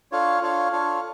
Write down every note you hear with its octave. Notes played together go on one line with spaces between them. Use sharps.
D4 F4 A4 C#5 F5
D4 F4 A4 C#5 F5
D4 F4 A4 C#5 F5